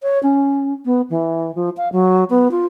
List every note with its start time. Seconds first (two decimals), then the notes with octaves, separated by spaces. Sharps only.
0.03 C#5
0.23 C#4
0.85 B3
1.10 E3
1.55 F3
1.77 F5
1.92 F#3
2.30 B3
2.51 F4